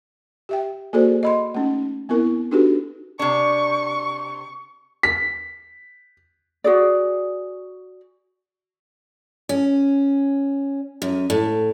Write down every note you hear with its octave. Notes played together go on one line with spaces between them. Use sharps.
G4 E5 G5
A#3 F#4 G#4 A4 C5 D5
D#5 B5 C6
A3 C#4 D#4
B3 C4 E4 A#4
D4 D#4 F#4 G4 A4 B4
C3 D4 C#6
B6
F#4 G#4 D5
C#4
F#2
A2